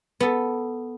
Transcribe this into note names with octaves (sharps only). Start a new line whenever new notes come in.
B3 A4